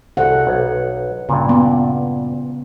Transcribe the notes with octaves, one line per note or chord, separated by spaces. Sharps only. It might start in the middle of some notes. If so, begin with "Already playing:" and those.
C2 F#4 A4 F#5
B1
G2 A#2 C#3
B3